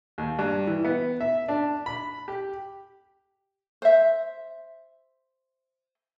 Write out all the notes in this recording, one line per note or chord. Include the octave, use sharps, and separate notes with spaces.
D#2
G2
E3
B3
E5
D4
B5
G4
C5 E5